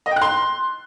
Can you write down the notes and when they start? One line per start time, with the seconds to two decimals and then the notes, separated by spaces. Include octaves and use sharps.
0.06 D#5
0.11 G5
0.16 F#6
0.22 C6